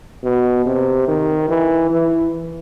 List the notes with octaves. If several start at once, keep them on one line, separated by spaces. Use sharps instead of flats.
B2
C3
D#3
E3
E3